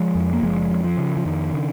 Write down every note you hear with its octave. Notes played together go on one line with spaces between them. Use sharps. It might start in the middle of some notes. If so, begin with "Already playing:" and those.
Already playing: F3 G#3
F2
A#3
F#1 F3 G#3
F2
F3
C#3
F3
F2 D#3
C#3